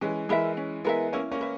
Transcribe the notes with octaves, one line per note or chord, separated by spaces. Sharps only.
E3 G#3 C#4
E3 G#3 E4 A#4 E5
C#4
G#3 B3 E4 A#4 E5
A#3 C#4 E4
A#3 C#4
B4 E5